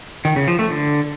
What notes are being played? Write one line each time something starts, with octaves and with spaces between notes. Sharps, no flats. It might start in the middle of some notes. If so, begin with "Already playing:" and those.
D#3
C#3
F3
A3
D3